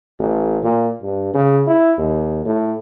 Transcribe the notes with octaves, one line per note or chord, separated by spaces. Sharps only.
A1
A#2
G2
C#3
E4
D#2
A2